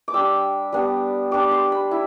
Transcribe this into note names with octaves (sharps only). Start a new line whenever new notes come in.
D6
G3 D4 E6
G3 B3 D4
G3 D4 D6
C6
B5
E4